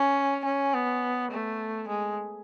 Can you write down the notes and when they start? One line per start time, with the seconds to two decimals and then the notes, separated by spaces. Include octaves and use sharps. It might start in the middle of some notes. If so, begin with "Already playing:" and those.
Already playing: C#4
0.45 C#4
0.74 B3
1.31 A3
1.88 G#3